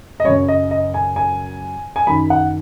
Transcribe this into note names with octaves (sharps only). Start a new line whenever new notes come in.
D#5
F#2 C#3 C#5
D#5
D#5
G#5
G#5
G#5
F#2 D#3 B5
F#5